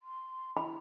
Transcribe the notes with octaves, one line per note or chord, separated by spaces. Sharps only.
C6
E4 B5